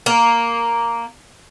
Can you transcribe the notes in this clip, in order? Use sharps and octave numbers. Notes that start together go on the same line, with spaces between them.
A#3